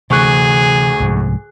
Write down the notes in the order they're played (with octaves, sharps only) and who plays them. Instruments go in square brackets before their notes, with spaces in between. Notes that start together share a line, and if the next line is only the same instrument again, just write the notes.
[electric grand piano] D2 C#6 F#6 [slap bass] C3 E3 [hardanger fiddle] G#4
[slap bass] C2 G#2 F3